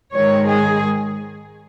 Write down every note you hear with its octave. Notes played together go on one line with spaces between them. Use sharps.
G#2 D#3 G#3 C#5
G#4